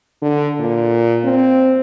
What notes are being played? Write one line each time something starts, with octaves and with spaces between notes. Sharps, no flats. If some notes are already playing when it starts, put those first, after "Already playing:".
D3
A#2
C4